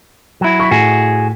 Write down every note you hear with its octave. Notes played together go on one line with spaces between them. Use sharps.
F#3 E4
C#6 B6
A2 F#4 G#4